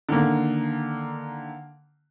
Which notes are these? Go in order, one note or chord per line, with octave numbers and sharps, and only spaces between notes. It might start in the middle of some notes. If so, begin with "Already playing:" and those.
D3 D#3 A#3